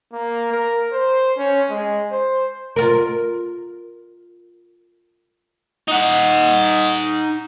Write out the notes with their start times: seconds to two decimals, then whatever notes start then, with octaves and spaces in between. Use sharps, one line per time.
0.13 A#3
0.52 A#4
0.92 C5
1.37 C#4
1.70 G#3
2.11 C5
2.76 F4 A#4
5.88 D#4 F#5